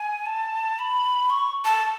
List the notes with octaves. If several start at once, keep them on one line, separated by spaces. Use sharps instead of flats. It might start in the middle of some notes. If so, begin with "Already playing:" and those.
Already playing: G#5
A5
B5
C#6
A5